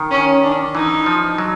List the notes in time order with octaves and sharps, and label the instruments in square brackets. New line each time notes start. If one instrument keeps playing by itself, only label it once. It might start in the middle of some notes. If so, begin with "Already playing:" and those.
Already playing: [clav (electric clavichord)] D#3
[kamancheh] C#4
D4
[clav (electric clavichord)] E3 [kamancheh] D#4
[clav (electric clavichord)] F3
F#3